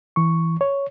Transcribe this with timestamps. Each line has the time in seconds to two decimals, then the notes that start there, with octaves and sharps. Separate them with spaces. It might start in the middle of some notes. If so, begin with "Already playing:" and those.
0.16 E3 C#6
0.61 C#5